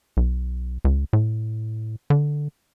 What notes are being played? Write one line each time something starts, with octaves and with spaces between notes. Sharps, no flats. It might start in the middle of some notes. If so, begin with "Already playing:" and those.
B1
C#2
A2
D3